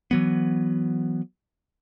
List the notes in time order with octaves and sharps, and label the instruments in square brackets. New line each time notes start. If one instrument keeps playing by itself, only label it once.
[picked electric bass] E3 F#3 B3